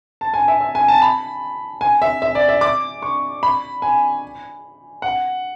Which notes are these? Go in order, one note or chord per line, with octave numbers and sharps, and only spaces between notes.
A5
G#5
E5
E5
G#5
A5
B5
G#5
E5
E5
D5
E5
D6
C#6
B5
G#5
F#5